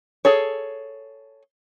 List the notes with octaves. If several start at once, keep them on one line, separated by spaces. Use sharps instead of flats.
G#4 A4 C#5